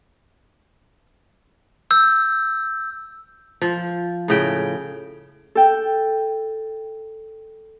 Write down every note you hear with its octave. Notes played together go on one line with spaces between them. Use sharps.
E6 G6
F3
A2 C#3 G5
A4 G5